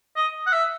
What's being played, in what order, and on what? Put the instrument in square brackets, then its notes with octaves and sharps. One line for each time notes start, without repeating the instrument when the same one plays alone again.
[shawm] D#5
F#5
E5